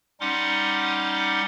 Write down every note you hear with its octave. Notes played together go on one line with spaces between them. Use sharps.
G3 C#4 D#4 F#5 C6 D6